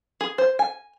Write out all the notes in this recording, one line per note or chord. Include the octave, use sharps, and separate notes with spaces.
G#4
C5
G#5